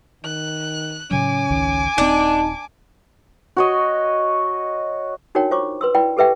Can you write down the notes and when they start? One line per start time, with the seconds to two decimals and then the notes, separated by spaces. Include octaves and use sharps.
0.25 D#3 F#6
1.11 A2 C#3 F#3 C#4 G#5 D6
1.50 G#1 C#2 D#3
1.98 D#1 C4 D4 D#4
3.56 F#4 C#5 D#5
5.35 D4 D#4 F#4 A#4 C#5 G5
5.51 F4 C5 C#5 C#6 D6
5.81 B4 C6 E6
5.94 E4 B4 D5 G5 B5
6.17 G4 A4 B4 E5 G5